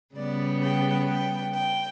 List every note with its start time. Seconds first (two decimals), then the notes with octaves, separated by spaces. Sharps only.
0.14 C#3 G3 B3 D5
0.61 G5
1.07 G5
1.53 G5